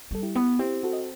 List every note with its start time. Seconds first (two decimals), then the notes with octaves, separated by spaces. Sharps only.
0.11 G3 A4
0.23 E4 G4
0.35 B3
0.59 C4 E4 G4
0.83 F#4 A4
0.93 D#5